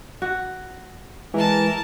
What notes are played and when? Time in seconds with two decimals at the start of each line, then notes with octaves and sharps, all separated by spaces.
0.22 F#4
1.34 E3 G#3 A#4 A5